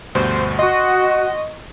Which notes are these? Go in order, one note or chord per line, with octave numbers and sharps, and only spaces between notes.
D2 G2 B2 C5
F#4 D#5 C6 C#6